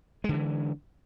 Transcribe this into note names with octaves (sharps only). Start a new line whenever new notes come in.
D3 E3 G#3